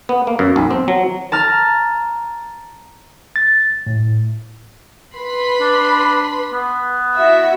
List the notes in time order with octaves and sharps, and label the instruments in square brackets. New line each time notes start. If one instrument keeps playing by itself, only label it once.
[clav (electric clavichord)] B3
A#3
F#2
B1
C4
F#3
[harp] A5 A#5 F6
[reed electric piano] A6
A2
[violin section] B4 B5 C6
[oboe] D4
B3
[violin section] E4 F#4 E5